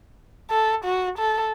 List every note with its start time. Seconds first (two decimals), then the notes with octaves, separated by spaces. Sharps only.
0.51 A4
0.85 F#4
1.19 A4